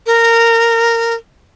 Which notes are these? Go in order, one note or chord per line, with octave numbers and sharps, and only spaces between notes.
A#4